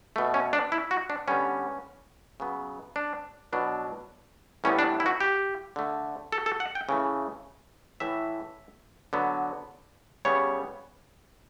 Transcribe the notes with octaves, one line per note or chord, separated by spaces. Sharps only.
B2 A3
C#4
D4
E4
F#4
D4
D3 G3 B3 C#4
C#3 F#3 B3
D4
B2 F#3 B3 D4
A2 E3 G3 B3 C#4
D4
E4
F#4
G4
D3 A3
A4
A4
F#5
G5
C#3 E3 A3
A2 E3 A3 E5
D3 F#3 B3
C#3 G3 B3 C#5